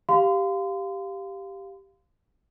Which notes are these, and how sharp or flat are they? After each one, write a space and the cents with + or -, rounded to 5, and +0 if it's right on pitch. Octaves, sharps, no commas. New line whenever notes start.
G4 +0 F5 +0 C6 -35